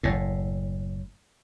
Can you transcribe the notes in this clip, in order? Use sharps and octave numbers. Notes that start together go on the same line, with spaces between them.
F#1 A2